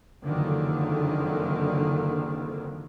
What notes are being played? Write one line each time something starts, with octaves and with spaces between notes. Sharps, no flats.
F#1 F2 D3 D#3